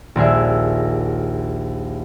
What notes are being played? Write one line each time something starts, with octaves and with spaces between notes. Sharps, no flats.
A#1 D#2 G#4 E5